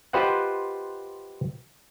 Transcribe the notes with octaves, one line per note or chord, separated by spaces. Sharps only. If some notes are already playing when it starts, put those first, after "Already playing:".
F4 G4 B4 C5 D#5 F#5